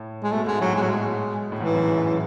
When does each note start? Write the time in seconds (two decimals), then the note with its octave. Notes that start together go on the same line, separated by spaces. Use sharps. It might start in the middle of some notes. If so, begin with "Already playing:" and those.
Already playing: A2
0.23 G#3
0.32 B2 A3
0.46 G#2 G#3
0.61 A2 F#3
0.75 B2 G#3
0.82 F#3
0.89 G#3
1.52 A2
1.60 G#2 E3
1.74 F#2
1.89 F#2